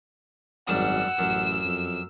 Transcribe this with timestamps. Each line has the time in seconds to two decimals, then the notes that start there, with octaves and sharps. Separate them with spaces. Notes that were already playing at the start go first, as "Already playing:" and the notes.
0.68 G#1 F#2 G3 F#5 E6
1.19 A1 F#2
1.65 F2